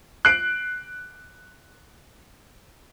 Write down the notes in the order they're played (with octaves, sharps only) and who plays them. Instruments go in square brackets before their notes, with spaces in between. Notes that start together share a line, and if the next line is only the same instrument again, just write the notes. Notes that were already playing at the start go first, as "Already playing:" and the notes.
[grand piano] F#6 C7 D7